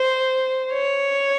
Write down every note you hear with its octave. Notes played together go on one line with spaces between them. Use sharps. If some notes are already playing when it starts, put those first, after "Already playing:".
Already playing: C5
C#5